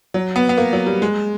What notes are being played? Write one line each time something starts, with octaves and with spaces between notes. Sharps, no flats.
F#3
B3
B3
A#3
F#3
G3
G#3